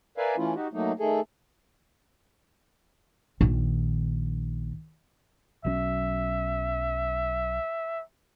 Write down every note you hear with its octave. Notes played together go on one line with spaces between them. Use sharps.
A#4 B4 D5 E5 F5 G#5
E3 A3 C#4 E4 F4
D#4 F#4 G4
F#3 A3 A#3 D#4
D#3 A3 G#4 A4
A#1 D#3
B1 F#3 C#4 E5